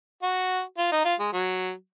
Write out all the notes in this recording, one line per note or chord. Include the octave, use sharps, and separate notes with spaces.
F#4
F4
D#4
F4
G#3
F#3